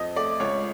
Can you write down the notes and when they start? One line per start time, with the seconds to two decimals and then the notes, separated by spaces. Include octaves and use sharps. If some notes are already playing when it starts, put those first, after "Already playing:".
Already playing: F2 D#5
0.16 A3 D5
0.40 C#2 C#5